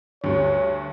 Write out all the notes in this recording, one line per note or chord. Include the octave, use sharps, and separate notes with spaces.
D2 G2 C#5